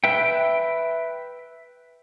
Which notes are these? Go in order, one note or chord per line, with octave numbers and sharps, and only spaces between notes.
B4 E5 G5